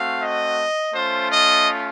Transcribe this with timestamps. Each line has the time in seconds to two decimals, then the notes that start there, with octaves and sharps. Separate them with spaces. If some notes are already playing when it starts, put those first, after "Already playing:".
Already playing: A3 C4 F#4 F5
0.23 D#5
0.94 A3 C#4 F4 C5
1.31 D#5